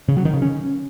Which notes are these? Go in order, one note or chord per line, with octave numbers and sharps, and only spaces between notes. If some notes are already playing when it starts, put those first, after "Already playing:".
C#3
F#3
D#3
C#3
C#4